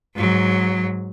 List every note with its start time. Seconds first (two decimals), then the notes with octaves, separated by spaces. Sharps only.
0.15 G#2 F#3